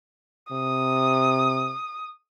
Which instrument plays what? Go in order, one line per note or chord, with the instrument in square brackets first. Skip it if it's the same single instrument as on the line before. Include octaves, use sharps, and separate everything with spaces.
[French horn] C3 [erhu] D#6